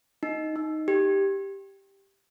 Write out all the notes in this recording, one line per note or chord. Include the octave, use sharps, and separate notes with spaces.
D#4
D#4
G4